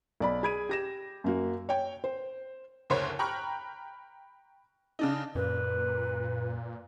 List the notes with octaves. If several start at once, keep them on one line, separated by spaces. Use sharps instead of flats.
B1 D5 B5
G#4 B5 G#6 D7 D#7
G4 A#6 E7
F#2 A#3 F#4
C#5 G5
C5
F#1 D2 A#4 C5 C#5 C#6
G5 A#5 B5 C#6 F6 F#6
C#3 D4 D#4
F#2 A#2 B4